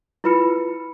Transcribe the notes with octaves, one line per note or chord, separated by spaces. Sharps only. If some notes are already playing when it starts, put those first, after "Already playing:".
E4 F4 B4 B5 F6 C#7